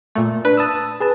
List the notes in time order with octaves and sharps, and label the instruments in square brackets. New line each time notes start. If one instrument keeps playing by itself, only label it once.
[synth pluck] A#2 A3
[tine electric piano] D4 [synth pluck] B4
[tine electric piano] A5 D#6 E6
G#4 B4 A5